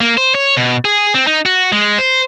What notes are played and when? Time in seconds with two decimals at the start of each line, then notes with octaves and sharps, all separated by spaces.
0.01 A#3
0.17 C5
0.35 C#5
0.57 B2
0.85 G#4
1.14 C4
1.27 D#4
1.46 F#4
1.72 G#3
1.98 C5